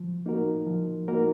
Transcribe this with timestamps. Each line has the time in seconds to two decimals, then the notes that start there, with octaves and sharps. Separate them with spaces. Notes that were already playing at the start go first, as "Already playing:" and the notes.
Already playing: F3
0.26 A#3 D#4 F#4 A#4
0.67 F3
1.08 A#3 D#4 F#4 A#4